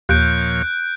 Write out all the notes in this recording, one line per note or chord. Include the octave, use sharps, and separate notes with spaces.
D#2 A#2 F3 C#5 F#6 G6 D7